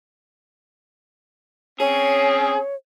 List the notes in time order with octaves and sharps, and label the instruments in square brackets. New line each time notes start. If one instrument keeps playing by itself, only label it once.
[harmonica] C4 C#4 [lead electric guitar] G#4 [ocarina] C#5